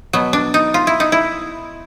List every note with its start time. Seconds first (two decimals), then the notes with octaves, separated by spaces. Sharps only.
0.13 B2 F#3 B3
0.33 D4
0.54 D#4
0.74 F4
0.87 E4
1.00 D#4
1.12 E4